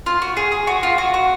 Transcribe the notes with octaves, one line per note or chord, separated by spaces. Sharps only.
F4
F#4
G#4
G#4
F#4
F4
F#4
F#4